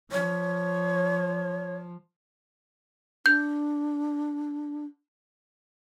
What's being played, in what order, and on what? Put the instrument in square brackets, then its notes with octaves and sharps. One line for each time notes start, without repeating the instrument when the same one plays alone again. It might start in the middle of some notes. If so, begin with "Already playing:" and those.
[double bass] F3 [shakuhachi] C#5
[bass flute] D4 [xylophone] G6